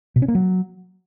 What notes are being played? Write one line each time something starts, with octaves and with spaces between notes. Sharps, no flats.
B2
C#4
A#3
F#3